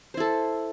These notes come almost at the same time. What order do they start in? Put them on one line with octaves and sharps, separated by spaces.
C5 E4 A4